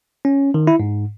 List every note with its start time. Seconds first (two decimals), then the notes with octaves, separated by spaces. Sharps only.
0.25 C#4
0.54 D#3
0.67 E4
0.80 G#2